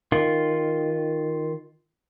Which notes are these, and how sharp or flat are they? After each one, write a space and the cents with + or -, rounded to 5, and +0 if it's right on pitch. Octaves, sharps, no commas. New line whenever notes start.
D#3 +0 F4 +0